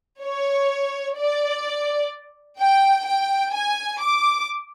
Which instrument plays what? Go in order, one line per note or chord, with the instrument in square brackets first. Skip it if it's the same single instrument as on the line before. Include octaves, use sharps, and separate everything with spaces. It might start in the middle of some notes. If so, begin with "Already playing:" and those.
[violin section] C#5
D5
G5
G5
G#5
D6